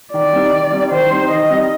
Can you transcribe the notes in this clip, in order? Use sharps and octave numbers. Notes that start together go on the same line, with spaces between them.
D#3 D5
G3 C4 D#4
D#3
G3 C4 D#4
D#3 C5
G3 C4 D#4
D#3 D#5
G3 C4 D#4